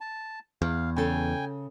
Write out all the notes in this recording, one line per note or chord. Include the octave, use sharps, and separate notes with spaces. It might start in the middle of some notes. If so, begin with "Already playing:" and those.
A5
E2 F5
C#3 A4 G5 G#5